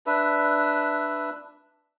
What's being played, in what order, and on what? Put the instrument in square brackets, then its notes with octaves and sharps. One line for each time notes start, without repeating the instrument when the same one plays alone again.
[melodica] D4 B4 E5